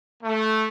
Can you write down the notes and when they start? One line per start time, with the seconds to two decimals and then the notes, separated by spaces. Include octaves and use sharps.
0.23 A3